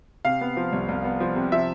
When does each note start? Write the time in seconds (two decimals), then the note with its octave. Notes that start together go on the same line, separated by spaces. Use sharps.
0.25 C3 F5
0.41 B3
0.57 F3
0.72 C2
0.88 C2
1.04 B3
1.20 F3
1.36 C3
1.52 F3 E5